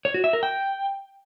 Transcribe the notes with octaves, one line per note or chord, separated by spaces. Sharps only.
C#5
F#4
E5
A#4
G5